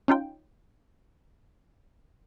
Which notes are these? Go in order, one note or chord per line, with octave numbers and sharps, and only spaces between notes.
C#4 D#4 F4 G5